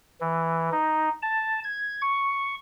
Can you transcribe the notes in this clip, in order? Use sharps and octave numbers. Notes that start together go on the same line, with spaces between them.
E3
D#4
A5
G#6
C#6